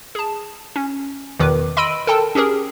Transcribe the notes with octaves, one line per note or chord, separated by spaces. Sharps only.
G#4 A5
C#4
E2 B2 D#3 B4 D6
D#5 B5 C6 E6 D7 D#7
A4 A#4 G5 A5
C#4 G4 G#4 A#4